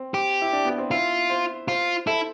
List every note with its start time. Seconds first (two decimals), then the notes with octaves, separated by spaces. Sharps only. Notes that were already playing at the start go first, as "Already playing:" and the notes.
Already playing: C4
0.14 G4
0.42 E4
0.53 D4
0.65 B3
0.78 C4
0.91 E4 F4
1.30 C5
1.68 F4 C5
2.07 E4 A4